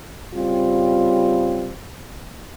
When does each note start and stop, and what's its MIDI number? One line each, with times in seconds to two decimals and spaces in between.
0.35 1.71 49
0.35 1.71 55
0.35 1.71 60
0.35 1.71 65